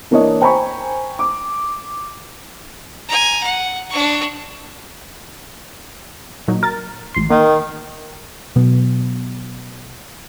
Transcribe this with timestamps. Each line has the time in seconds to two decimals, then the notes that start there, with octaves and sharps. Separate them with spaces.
0.11 E3 A#3 D4 C#5 D#5
0.41 C5 G5 G#5 A#5 B5 C#6
1.19 D6
3.09 G#5 A#5
3.43 F#5
3.90 D4 C#6
6.48 A#2 F#3 D#4
6.63 A#4 A6
7.14 A1 C6
7.31 D#3 A#3
8.56 B2 F#3 B3